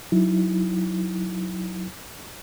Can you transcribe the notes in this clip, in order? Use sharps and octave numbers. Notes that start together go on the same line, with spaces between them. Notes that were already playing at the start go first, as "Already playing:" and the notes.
F#3 D#4 E4